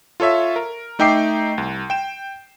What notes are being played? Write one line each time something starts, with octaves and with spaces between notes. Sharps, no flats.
F4 A4 C#5 E5
A#4
A3 D#4 E5 G5 D6 C7
C2
G5 E7